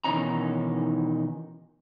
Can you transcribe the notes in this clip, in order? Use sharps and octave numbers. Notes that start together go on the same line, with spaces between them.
B2 D#3 E3 C#4 D#4 A#5